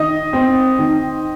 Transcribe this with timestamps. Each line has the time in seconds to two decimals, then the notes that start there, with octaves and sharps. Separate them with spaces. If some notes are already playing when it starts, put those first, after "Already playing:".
Already playing: D#3 D#5
0.33 C4
0.78 D#3